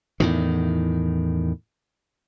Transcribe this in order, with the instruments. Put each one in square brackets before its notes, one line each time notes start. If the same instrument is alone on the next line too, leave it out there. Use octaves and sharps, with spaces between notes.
[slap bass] E2 A2 D#3